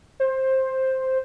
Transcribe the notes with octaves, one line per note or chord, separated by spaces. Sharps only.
C5